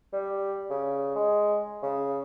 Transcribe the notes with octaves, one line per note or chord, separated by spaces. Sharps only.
G3
C#3
G#3
C#3